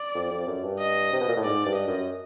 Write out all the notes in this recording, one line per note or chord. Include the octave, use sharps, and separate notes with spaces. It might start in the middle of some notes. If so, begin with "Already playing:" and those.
Already playing: D5
F2
F2
F#2
G2
D#5
C3
B2
A#2
A2
G#2 D5
G2
D#5
F#2